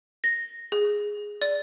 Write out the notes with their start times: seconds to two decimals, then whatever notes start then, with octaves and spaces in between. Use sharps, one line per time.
0.24 A#6
0.72 G#4
1.42 D5